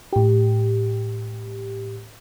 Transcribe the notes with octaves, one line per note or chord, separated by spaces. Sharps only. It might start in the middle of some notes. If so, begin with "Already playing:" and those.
A2 G4